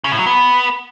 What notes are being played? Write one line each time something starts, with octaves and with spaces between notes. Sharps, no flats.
C#3
A2
F#3
B3